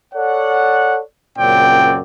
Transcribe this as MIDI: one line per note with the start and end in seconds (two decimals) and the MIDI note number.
0.14 1.00 69
0.14 1.00 73
0.14 1.00 74
0.14 1.00 78
1.39 2.00 42
1.39 2.00 46
1.39 2.00 49
1.39 2.00 60
1.39 2.00 74
1.39 2.00 79